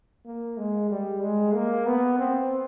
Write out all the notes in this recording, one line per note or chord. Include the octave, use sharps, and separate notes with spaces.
A#3
G#3
G3
G#3
A#3
B3
C4